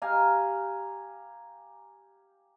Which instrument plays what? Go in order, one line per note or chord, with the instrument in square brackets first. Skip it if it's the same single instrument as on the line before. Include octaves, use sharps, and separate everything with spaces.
[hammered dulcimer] G4 F5 G#5 A#5